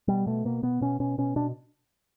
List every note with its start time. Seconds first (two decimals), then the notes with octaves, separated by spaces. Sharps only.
0.08 B2 G3
0.26 B2 A3
0.45 B2 A#3
0.63 B2 B3
0.81 B2 C#4
1.00 B2 C#4
1.18 B2 C#4
1.36 B2 D4